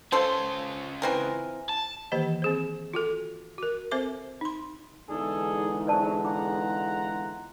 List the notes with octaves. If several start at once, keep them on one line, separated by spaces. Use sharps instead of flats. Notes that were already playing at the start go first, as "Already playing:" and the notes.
C#3 F4 A4 C5
E3 C4 A#4
A5
D#3 E3 A#3 G4 C5 D#5
C4 G#4 C5
F4 F#4 A4
F#4 A#4
C4 A4 C5 E5 D6
D#4 C6
E2 D3 G#3 D4 D#4 G#4 A4
F2 F#3 B4 D5 A5
F4 F#5 A#5 D6